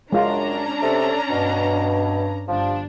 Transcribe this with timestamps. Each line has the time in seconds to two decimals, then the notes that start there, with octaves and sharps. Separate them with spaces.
0.12 F#2 G#3 C#4 D4 F4 A#5
0.82 C3 A4
1.30 G2 B2
2.48 G1 F3 G3 D4